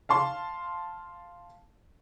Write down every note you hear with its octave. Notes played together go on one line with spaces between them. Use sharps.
F5 A5 C6